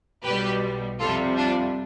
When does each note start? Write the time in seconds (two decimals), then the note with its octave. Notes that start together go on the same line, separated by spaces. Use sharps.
0.24 B1 B2 G3 G4 B4
1.00 F2 C3 G3 F4 A4
1.37 D4 F4